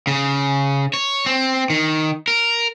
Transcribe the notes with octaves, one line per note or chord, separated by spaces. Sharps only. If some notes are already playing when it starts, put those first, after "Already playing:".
C#3
C#5
C4
D#3
A#4